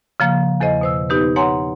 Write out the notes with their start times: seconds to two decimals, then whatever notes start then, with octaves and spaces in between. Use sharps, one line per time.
0.20 C#3 F3 A#3
0.60 E2 A4 C5 D#5
0.81 B2 C5 E6
1.10 B3 D#4 G4 B4
1.36 C#5 F#5 G#5 A#5 C6